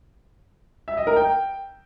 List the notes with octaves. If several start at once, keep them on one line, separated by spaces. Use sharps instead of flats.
E5
D#5
A#4
G5